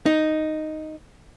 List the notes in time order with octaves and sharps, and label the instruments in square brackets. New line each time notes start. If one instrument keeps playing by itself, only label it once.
[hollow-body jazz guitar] D#4